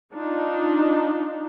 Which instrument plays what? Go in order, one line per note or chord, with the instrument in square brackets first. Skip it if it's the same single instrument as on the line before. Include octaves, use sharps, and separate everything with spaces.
[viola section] D4 D#4 F4